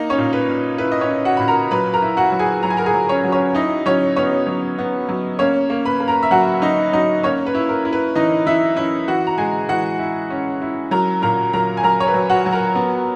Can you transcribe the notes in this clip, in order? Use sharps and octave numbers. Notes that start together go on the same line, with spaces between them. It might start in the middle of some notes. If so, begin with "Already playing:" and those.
Already playing: A#3 D#4 D#5
C#4 C#5
A#2
B4
A#2
E4 B4
D#5
C#4 C#5
E4
F#4 F#5
A#2 B5
A#4 A#5
F#3 B4 B5
A#4 A#5
E4
F#4 F#5
F#3
G#4 G#5
F#3 A#5
G#5
A#4 A#5
G#4 G#5
F#3
C#4 C#5
F#3
C#4 C#5
D#4 E4 D#5
F#3 C#4 C#5
B3 C#4 C#5
F#3
B3
F#3
A#3 C#4 C#5
A#3
B4 B5
A#3
A#4 A#5
E5
F#3 F#4 F#5
F#3 D#4 D#5
F#3 D#4 D#5
A#3 C#4 C#5
B4
E4
A#4
E4
B4
E3 D#4 D#5
E3 E4 E5
C#4 E4 E5
E3 F#4 F#5
A#5
G#3 G#4 G#5
E3 F#4 F#5
E4
C#4
E4
F#3 A#4 A#5
A#2 A#4 A#5
F#3 A#4 A#5
G#5
F#3 A#4 A#5
C#5
B4
F#3
F#4 F#5
F#3
A#4 A#5
B3